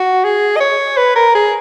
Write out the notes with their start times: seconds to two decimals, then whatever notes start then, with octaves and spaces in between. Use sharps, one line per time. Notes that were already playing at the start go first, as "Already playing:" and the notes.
Already playing: F#4
0.25 G#4
0.56 D#5
0.60 C#5
0.97 B4
1.16 A#4
1.35 G#4